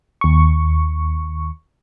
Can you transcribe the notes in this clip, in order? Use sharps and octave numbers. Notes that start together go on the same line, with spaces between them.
D#2 C#6